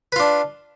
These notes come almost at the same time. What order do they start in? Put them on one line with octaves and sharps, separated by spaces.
B4 F4 D4